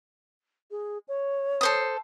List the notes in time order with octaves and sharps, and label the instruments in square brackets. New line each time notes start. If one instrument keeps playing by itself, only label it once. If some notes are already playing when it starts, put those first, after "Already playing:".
[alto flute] G#4
C#5
[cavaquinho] A4 C5 D#6